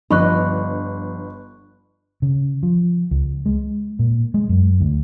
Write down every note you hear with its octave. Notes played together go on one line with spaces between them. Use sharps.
G1 F3 D4 D#5 B5 C#6 F#6
C#3
F3
C#2
G#3
A#2
G#3
F#2
D2